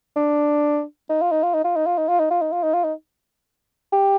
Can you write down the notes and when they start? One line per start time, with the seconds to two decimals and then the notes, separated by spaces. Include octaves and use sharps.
0.16 D4
1.10 D#4
1.22 F4
1.32 D#4
1.43 F4
1.54 D#4
1.64 F4
1.76 D#4
1.86 F4
1.98 D#4
2.09 F4
2.20 D#4
2.31 F4
2.42 D#4
2.52 F4
2.63 D#4
2.74 F4
2.84 D#4
3.92 G4